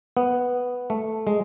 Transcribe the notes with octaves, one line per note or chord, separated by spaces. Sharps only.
B3
A3
G#3